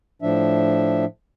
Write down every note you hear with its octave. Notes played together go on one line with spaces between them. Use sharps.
A2 F3 D4 E5